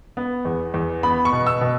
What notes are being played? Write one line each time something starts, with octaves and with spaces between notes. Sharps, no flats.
B3
E2
E2
B3 B5
C#6
B2
E6
B2